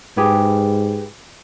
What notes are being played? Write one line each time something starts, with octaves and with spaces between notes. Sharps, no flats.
G#2 G4 G#4 B4